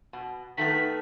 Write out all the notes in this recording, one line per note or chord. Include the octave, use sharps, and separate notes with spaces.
B2
D#3 A3 B3 B6